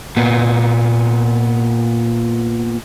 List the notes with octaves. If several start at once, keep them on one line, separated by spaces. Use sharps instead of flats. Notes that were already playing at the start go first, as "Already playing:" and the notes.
A#2 B3